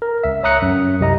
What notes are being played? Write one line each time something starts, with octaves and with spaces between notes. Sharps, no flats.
A#4
C#2 E5
C#5 E5 A#5 D#6 F#6 C#7
F#2
C2 G4 D#5 A#5